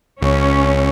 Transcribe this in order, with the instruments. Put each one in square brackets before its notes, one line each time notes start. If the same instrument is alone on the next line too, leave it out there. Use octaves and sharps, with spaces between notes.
[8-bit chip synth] C#2 [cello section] C#4